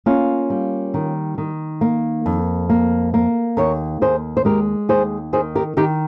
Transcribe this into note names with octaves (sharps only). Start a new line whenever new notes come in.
A#3 C#4 F4
G3
D#3
D#3
A#3
F2
A#3
A#3
D#2 A#4 C#5
D#2 G#4 C5
C5
G#3 G4 A#4
D#2 G#4 C5
D#3 G#4 C5
G4 A#4
D#3 D#4 G4